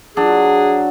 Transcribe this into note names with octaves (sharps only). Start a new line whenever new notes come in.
F#3 D4 G#4